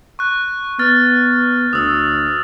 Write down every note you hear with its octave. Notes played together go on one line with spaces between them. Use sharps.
C#6 F#6
B3 F6 A6
D2 D#6 E6